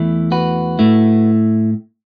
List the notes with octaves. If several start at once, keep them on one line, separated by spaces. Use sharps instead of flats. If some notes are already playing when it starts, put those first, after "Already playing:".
Already playing: E2 E3 A3 E4
F#4 B4
A2 A3 E4